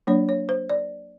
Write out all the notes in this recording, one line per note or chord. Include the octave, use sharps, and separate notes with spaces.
F#3 A#3 D4 C#5
C#5
C5
D5